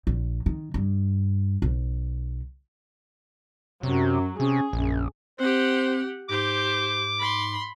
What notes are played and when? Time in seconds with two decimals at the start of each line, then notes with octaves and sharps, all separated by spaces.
0.07 A#1
0.46 D#3
0.74 G2
1.62 B1
3.83 F#2 C3 F#3
4.40 C3 C#4 G#4
4.73 A#1 F#2
5.39 C4 G4 C5 F#5
6.29 G#2 G4 C5 D6
7.19 B5 C6